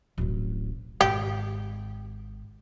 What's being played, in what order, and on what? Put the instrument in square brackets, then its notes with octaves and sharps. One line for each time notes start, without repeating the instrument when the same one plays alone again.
[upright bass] D1 A1
[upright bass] G#1 [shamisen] G4